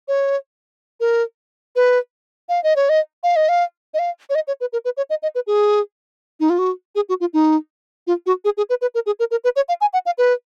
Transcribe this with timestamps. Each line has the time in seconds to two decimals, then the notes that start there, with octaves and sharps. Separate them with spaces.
0.08 C#5
1.00 A#4
1.76 B4
2.49 F5
2.64 D#5
2.76 C#5
2.89 D#5
3.23 F5
3.36 D#5
3.49 F5
3.94 D#5
3.99 F5
4.30 C#5
4.35 D#5
4.47 C#5
4.61 B4
4.73 A#4
4.85 B4
4.97 C#5
5.10 D#5
5.23 D#5
5.35 B4
5.47 G#4
6.40 D#4
6.50 F4
6.59 F#4
6.95 G#4
7.09 F#4
7.20 F4
7.33 D#4
8.07 F4
8.26 F#4
8.45 G#4
8.57 G#4
8.69 B4
8.81 B4
8.95 A#4
9.06 G#4
9.19 A#4
9.31 A#4
9.44 B4
9.56 C#5
9.69 F5
9.81 G#5
9.93 F#5
10.06 F5
10.18 B4